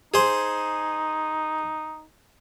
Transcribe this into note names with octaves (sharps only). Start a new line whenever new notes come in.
D#4 G#4 C5